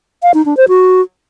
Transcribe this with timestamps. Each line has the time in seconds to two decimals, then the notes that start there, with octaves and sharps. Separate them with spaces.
0.23 F5
0.34 D#4
0.46 D4
0.57 C5
0.68 F#4